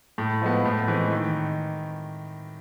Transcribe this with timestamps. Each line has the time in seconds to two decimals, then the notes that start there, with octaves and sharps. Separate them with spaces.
0.18 A2
0.41 F3 G#3 B3
0.65 A2
0.88 E3 G#3 C4
1.12 D#3